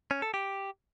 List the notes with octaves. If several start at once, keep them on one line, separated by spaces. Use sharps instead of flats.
C#4
A4
G4